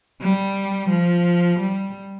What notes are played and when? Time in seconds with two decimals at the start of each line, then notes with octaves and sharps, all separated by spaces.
0.21 G3
0.90 F3
1.59 G3